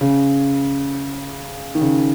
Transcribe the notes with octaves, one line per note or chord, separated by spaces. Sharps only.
C#3
D#3
C#3